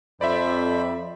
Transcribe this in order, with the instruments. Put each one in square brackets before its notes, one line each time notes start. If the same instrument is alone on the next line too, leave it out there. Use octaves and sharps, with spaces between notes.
[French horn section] F2 [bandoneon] C5 B5 [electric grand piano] D5 E5